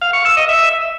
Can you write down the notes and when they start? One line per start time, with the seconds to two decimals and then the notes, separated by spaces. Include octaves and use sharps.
0.01 F5
0.13 C#6
0.25 E6
0.37 D#5
0.49 E5